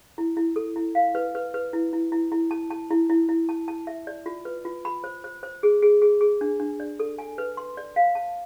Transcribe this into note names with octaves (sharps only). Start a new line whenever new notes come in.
E4
E4
A4
E4
F5
B4
B4
B4
E4
E4
E4
E4
A5
A5
E4
E4
E4
A5
A5
E5
D5
F4
B4
F4
B5
C5
C5
C5
G#4
G#4
G#4
G#4
D4
D4
D5
A4
G#5
B4
C6
D5
F5
A5